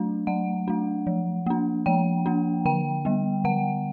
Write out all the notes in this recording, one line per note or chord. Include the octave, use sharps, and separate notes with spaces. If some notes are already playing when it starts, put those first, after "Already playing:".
Already playing: F#3 A3 D4
F#3 F#5
A3 D4
F3
A#3 D4
F3 G5
A#3 D4
D3 G5
G3 B3
D3 F#5